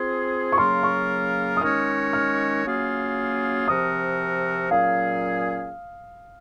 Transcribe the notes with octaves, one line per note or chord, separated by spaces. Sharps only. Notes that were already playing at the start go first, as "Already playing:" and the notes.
Already playing: C4 F4 G#4
C#6
C#3 F#3 A#3 F4 A#4 C6
C#6
D#6
D#3 G#3 C#4 F#4 C#5 F6
F6
F#3 A#3 C#4 F4 G#4
C3 F3 C4 F#4 A#4 D#6
A#2 F#3 C#4 G#4 F5